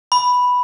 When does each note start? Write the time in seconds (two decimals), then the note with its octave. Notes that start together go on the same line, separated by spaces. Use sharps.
0.12 B5